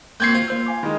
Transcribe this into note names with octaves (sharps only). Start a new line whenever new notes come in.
A#3 C4 F#4 G6 G#6 C7
F4 C5
A#3 C5 E6
F5 G#5 D6
D#3 G#3 E4